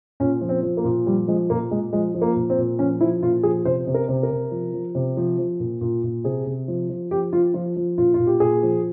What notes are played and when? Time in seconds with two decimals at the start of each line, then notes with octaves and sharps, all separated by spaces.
0.20 A#2 C#4
0.41 F3
0.49 C4
0.63 F3
0.77 A#3
0.84 A#2
1.06 F3 G3
1.28 F3 G#3
1.50 A#2 A#3
1.71 A#2 G#3
1.93 F3 G#3
2.14 F3
2.22 A#3
2.36 A#2
2.50 C4
2.58 A#2
2.79 F3 C#4
3.01 F3 E4
3.22 A#2 F4
3.43 F3 G#4
3.65 C3 C5
3.87 C3
3.94 A#4
4.09 C3
4.23 A#4
4.30 C3
4.51 F3
4.73 F3
4.95 C3
5.17 F3
5.39 F3
5.60 A#2
5.81 A#2
6.03 A#2
6.24 C3 G#4
6.46 C3
6.68 F3
6.90 F3
7.11 F3 G4
7.33 F3 F4
7.54 F3 F4
7.76 F3
7.98 A#2 F4
8.14 F4
8.19 A#2
8.27 G4
8.40 A#2 G#4
8.63 F3